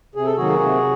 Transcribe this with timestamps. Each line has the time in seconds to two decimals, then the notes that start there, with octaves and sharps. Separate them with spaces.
0.15 C3 G#4
0.26 A4
0.36 D#3 F#3 A#3 F#4 G#4
0.60 C3